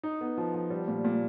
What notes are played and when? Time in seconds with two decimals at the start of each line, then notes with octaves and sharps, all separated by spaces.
0.03 D#4
0.21 B3
0.37 F3
0.54 F3
0.70 G3
0.88 A#2
1.05 A#2